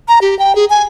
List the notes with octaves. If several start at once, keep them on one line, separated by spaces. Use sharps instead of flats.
A#5
G4
G5
G#4
G#5